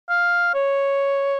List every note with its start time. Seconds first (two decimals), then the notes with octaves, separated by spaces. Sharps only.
0.10 F5
0.54 C#5